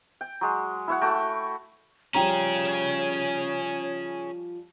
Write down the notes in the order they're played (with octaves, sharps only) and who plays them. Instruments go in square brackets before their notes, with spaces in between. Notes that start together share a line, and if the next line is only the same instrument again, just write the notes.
[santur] G5
F#3 G#3
E4 C#5 F#5
A3 F#4 G5
[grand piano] F3 G3 F7 [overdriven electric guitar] C#4 G#4 [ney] C#5 [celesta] G5 A#5